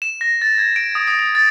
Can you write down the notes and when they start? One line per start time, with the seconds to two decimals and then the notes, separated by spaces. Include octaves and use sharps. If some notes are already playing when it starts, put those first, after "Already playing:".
0.02 E7
0.21 A#6
0.42 A6
0.58 G#6
0.76 D7
0.95 D#6
1.08 D#6
1.19 D#6
1.35 A6